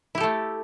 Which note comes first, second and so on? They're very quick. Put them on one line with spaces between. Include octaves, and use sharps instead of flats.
E4 G4 A4 A3